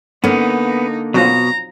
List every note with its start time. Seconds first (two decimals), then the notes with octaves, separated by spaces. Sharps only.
0.24 D3 A#3 B3 C#4 D#4
1.14 B2 F#3 C4 F4 A#5